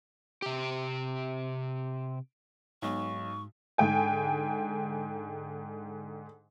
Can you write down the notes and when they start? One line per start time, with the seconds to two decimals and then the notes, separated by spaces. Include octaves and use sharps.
0.42 C3 G4
2.82 B1 G#2 C#6
3.78 G#2 D3 G5 G#5